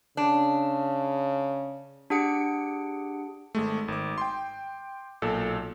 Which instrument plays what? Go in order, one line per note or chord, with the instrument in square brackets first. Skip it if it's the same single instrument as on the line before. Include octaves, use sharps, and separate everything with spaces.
[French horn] C#3 [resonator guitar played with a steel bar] D4
[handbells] D4 G4 G#4 F#5 C#7 D7
[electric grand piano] G#1 G#3 A3
G#1 D6
G5 C6
B1 A#2 A4